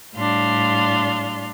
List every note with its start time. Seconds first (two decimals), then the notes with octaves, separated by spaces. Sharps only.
0.15 A2 G3 D4 F5 C6